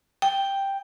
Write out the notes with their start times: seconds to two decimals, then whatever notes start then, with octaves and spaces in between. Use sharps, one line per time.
0.22 G5